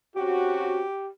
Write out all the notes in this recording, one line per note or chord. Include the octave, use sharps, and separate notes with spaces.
C3 C#4 F#4 G4